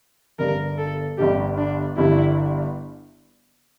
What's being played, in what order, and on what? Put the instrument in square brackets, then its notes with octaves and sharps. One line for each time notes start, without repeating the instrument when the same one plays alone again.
[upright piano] G1 G2 D3 G3 [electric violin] A#4
[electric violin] A4
[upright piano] G1 G2 D3 G3 [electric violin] G4
[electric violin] D4
[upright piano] G1 G2 D3 G3 [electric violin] E4